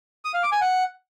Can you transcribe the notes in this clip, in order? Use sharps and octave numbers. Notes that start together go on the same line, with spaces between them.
D#6
F5
D6
G#5
F#5